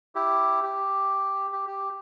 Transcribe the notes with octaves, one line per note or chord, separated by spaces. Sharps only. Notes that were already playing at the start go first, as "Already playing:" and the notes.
E4 G4
G4
G4
G4